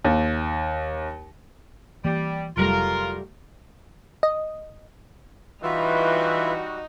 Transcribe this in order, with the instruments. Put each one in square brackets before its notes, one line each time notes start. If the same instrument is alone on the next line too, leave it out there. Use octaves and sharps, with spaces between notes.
[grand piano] D#2
[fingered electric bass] E3 A#3 [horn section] G3
[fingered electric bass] F1 [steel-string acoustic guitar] F#3 G3 A3 [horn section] F4 A#4
[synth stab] D#5
[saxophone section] E3 [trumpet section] G3 F#4 [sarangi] D#4 [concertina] F4 B4 E5